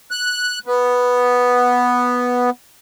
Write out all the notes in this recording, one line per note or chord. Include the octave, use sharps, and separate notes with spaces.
F#6
B3